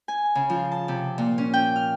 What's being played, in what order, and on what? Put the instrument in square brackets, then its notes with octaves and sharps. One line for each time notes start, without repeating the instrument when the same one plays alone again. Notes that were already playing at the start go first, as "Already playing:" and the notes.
[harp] G#5
C#3
F3
A5
C3
A#2
C#4
G5
F6